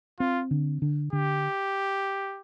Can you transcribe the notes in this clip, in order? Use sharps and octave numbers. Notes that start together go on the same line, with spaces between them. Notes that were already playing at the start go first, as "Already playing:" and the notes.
C4 F4
D3
D3
D3 G4